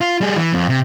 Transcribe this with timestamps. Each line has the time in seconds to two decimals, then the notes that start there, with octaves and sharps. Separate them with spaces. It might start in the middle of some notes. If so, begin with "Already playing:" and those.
0.01 F4
0.21 G3 G#4
0.36 E3
0.53 F2
0.69 C3